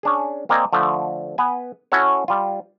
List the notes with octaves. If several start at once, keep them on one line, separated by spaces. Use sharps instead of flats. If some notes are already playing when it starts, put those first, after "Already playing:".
C#4 D4 G#4
A#3 C4 A#4 D5 D#5 G#5
D3 F3 A3
B3 B4 G#5
C#4 E4 F#4 A4 C#5
G3 F4